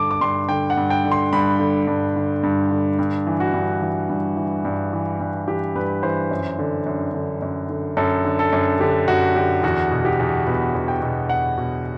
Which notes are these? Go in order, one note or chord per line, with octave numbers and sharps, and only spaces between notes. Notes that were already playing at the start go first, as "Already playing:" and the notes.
Already playing: G2 D3 A5 D6
D6
G2 C6
D3 G5
F#5
G2
G5
D3
C6
G2 B5
D3
G2
D3
G2
D3
G2
E3
F#4
G2
E3
G2
E3
G2
E3
G2
E3 G4
G2 B4
E3 C5
F#2
D3
F#2
D3
F#2
D3
F#2 A4
D3
A4
F#2
D3 G4
F#2 F#4
D3 G4
E2 F#4
B2
G4
E2
B2 B4
E2
G5
B2
E2 F#5
B2